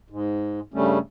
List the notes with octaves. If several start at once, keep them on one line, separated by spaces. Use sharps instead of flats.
G#2
G2 C#3 G3 A3 C#4